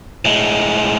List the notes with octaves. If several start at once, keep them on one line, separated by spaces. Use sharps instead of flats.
A2 G#3